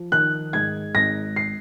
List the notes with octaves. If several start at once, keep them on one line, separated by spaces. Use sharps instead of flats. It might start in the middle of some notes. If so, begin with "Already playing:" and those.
Already playing: F3
D#3 F#6
G#2 G#6
G#1 A#6
C7